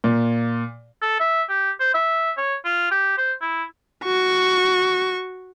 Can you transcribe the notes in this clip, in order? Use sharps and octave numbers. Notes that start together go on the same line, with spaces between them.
A#2
A4
E5
G4
C5
E5
C#5
F4
G4
C5
E4
F#4 C#6